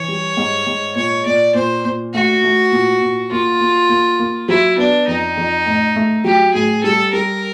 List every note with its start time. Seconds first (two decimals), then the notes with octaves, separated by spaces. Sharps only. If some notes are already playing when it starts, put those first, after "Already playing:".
Already playing: E3 C#5
0.08 G3
0.37 G#2
0.67 G#2
0.96 A#2 C#5
1.26 A#2 D5
1.55 A#2 C5
1.85 A#2
2.13 A3 F#4
2.44 A3
2.72 A#2
3.02 A#2
3.31 A#3 F4
3.61 A#3
3.89 A#3
4.19 A#3
4.48 F#3 E4
4.77 B3 D4
5.07 F2 D#4
5.37 F2
5.66 A2
5.96 A3
6.24 F#3 G4
6.54 A2 G#4
6.84 G3 A4
7.13 G3 A#4